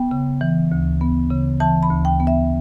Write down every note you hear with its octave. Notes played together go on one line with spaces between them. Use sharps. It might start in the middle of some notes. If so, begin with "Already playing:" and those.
Already playing: B3 G5
C#3
E3
D2
B3
C#3
E3 A5
B5
D2
G5
B3
E5